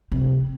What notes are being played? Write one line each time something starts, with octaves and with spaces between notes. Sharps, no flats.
C3